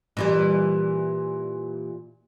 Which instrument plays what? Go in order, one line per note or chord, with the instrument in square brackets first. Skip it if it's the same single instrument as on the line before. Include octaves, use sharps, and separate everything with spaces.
[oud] A#2 E3 G3